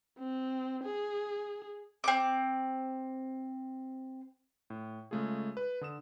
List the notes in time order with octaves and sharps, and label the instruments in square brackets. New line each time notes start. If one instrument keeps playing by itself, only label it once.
[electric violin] C4
G#4
[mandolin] C4 D6
[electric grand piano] A2
C#3 G#3 A3 F4 G#4
B4
D3 D#6 E7